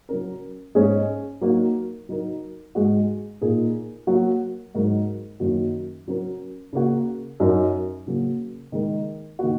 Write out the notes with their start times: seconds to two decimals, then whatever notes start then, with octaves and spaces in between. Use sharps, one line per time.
0.09 F#3 C#4 A#4
0.75 G#2 G#3 C#4 G#4
1.41 F#3 A#3 D#4 F#4
2.09 F#3 D#4 A#4
2.75 G#2 G#3 F#4
3.41 A#2 A#3 D#4 G#4
4.07 F#3 A#3 F#4
4.75 G#2 F#3 D#4 F#4 A#4
5.40 F#2 D#3 F#3 A#3 F#4
6.07 F#3 C#4 A#4
6.73 C#3 A#3 F#4
7.40 F#2 F#3 D#4 A#4
8.07 C#3 F#3 A#3
8.72 D#3 G#3 D#4 A#4
9.39 D#3 A#3 F#4